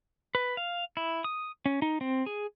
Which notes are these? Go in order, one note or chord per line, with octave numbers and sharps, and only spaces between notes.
B4
F5
E4
D#6
C#4
D#4
C4
G#4